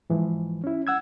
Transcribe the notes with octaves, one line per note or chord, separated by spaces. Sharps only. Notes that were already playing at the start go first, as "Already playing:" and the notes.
G#2 E3 F3
C#4 E4
F#5 E6 G#6